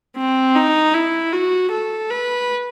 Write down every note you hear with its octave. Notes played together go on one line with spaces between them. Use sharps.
C4
D#4
E4
F#4
A4
B4